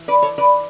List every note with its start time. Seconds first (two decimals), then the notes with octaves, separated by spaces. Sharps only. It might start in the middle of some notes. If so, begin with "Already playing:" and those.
Already playing: E3
0.08 B4 D5
0.23 A4 C#5
0.38 B4 D5